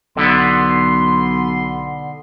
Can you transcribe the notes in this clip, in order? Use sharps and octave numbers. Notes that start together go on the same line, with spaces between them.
B1 D3 B3 C6